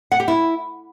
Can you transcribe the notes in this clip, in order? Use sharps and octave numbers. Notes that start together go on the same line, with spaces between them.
F#5
G4
E4